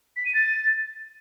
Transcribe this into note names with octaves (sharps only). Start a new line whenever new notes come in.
B6
D#7
A6